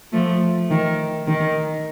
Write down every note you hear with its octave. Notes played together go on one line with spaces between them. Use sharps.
F3 A3
D#3
D#3